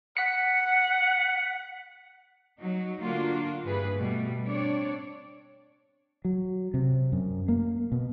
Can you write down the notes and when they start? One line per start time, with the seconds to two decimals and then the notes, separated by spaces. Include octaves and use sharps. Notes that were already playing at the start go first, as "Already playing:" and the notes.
0.17 F#5 B6 C#7
2.60 F#3 D#4
3.00 D3 A#3 D4 F4 F#4
3.65 G2 E3 G#4 B4
3.98 B2 G3 A3
4.45 C4 D4 C#5 D5
6.25 F#3
6.74 C3
7.12 F#2
7.48 A#3
7.92 B2